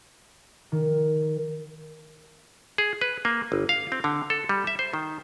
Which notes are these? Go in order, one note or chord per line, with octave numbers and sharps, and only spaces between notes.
D#3
G#4
B4
A#3
G1
F5
C4
D3
A4
G3
E5
C5
D#3